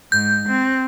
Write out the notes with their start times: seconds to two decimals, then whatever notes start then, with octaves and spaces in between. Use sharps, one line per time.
0.12 G#2 G6
0.49 C4